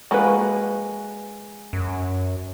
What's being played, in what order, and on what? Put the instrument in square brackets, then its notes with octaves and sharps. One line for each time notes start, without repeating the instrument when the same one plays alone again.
[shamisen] F3 A#3 F#4 [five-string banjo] G#3 B4
[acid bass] F#2